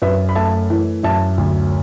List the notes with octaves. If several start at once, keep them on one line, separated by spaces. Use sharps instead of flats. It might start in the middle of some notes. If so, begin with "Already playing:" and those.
F#2 B4 E5
B5
A3 E5 A5
E3
F#2 E5 A5
D2